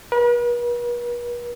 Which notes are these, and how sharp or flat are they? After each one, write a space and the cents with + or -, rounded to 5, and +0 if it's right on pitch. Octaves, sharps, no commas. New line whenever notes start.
B4 -45